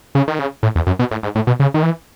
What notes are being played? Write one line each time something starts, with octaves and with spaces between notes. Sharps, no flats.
C#3
D#3
C#3
A2
E2
F#2
B2
A2
G#2
A2
B2
C#3
D#3
E3